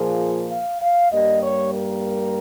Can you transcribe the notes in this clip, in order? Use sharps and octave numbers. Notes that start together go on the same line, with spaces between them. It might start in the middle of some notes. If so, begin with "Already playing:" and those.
Already playing: A#2 F3 A#3 G#4
F5
F5
G2 G3 A#3 D#5
C#5
A#4